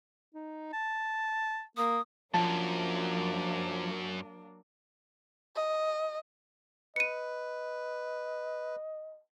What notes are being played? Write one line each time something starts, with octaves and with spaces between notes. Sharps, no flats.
D#4
A5
A#3 D#6
C#2 F#2 F3 F#3 A#3 D4 A5
D#5
B4 D#5 C#7 D#7